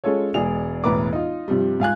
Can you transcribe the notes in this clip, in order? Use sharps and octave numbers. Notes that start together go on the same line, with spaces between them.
G#3 C#4 F4 A4 C#5
E1 G#3 G#4 D5 F7
E1 A2 B4 A#5 D6
D#4 F4
G2 C3 F3 G3
G#2 F5 G#5 F#6